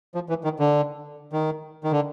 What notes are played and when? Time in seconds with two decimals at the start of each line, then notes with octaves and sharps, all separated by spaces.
0.15 F3
0.29 E3
0.44 D#3
0.59 D3
1.33 D#3
1.84 D#3
1.92 D3